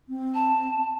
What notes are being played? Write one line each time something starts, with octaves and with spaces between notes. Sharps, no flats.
C4
A5